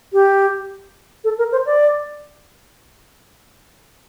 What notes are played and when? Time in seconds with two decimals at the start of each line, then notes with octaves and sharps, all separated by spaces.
0.13 G4
1.24 A4
1.38 A#4
1.52 C5
1.66 D5